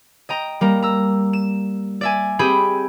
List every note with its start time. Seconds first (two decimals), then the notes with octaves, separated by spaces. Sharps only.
0.29 D#5 G5 A#5
0.61 G3 A#3 A#5
0.82 A#5 E6
1.33 E7
2.01 D5 E5 G#5
2.39 C4 G4 G#4 G5 B5